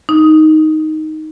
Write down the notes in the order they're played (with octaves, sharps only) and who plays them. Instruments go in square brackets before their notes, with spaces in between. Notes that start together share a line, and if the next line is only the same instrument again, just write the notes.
[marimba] D#4